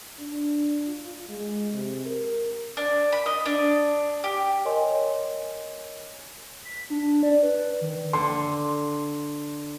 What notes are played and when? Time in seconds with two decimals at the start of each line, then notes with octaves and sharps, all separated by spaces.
0.18 D4
0.88 F4
1.30 G#3
1.72 C3
2.06 A#4
2.77 D4
3.12 B5
3.26 D#5
3.46 D4
4.24 G4
4.65 A#4 C#5 D#5 G#5 C6
6.65 B6
6.90 D4
7.23 D5
7.43 B4
7.81 D#3
8.13 D3 C6